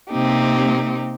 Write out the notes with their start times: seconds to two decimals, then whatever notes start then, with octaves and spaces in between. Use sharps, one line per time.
0.10 C3 A#3 C4 D#4 G4